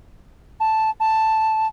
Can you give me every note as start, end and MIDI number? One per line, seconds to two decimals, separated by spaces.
0.60 0.90 81
1.00 1.67 81